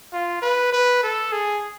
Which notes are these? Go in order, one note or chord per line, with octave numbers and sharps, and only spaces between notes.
F4
B4
B4
A4
G#4